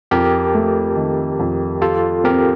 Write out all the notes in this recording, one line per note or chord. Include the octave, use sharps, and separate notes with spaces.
F2 G4 A#4
A3
D#3
F2
F4 G4 A4
C4 G4 A#4